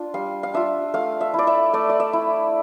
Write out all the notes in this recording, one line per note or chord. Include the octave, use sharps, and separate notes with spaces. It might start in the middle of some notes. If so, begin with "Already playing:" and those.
Already playing: D4 F4
G3 F5
F5
D4 F4 E5
A3 F5
E5
E4 D5
E5
A3 D5
D5
E5
E4